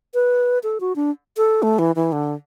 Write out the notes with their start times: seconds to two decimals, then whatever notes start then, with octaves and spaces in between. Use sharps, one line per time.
0.14 B4
0.63 A4
0.80 F#4
0.96 D4
1.37 A4
1.63 A3
1.79 E3
1.96 E3
2.12 D3